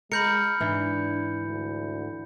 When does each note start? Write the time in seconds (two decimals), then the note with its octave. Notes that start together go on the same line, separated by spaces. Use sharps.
0.12 G#3 A#4 B5 G6 C#7
0.61 G#2 E3 D4
1.41 D2